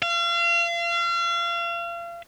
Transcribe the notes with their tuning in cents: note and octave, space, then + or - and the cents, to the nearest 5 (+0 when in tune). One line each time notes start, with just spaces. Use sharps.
F5 -35